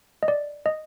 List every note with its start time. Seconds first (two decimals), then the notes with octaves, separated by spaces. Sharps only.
0.23 D#5
0.28 D5
0.66 D#5